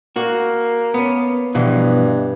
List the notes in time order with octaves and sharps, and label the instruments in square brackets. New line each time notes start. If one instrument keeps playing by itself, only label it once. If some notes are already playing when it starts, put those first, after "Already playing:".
[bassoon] A#3 [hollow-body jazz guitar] F#4
[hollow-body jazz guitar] B3 C#4
[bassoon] G2 [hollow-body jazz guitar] B2 E3 F3